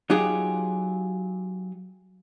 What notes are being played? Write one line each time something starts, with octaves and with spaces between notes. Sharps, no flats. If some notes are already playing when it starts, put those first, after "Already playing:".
F#3 D#4 F4 G4 G#4